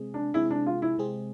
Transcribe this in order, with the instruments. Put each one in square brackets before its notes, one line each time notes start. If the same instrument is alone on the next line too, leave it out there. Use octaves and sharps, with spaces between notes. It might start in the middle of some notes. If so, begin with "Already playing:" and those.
Already playing: [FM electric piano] C3 G#3 C4 G#4
[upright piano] D4
[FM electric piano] C3 G#3 C4 G#4 [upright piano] E4
[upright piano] D4
F4
E4
[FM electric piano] C3 G#3 C4 G#4